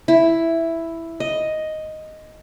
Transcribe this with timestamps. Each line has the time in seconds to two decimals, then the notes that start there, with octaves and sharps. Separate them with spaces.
0.08 E4
1.20 D#5